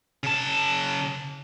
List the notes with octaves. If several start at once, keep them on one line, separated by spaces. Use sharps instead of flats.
C#3 A5